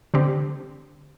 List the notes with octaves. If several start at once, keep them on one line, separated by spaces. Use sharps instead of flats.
D3 C4 G4